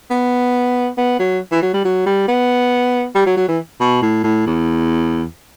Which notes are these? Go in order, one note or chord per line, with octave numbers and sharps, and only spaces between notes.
B3
B3
F#3
E3
F#3
G3
F#3
G3
B3
G3
F#3
F#3
E3
B2
A2
A2
E2